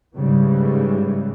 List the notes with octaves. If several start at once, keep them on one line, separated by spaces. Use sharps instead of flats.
G#2 C#3 E3 G3 G#3